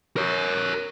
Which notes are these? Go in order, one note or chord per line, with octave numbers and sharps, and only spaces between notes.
A#4 C#5